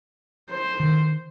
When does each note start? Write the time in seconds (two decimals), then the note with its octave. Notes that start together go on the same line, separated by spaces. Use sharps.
0.50 C5
0.80 D#3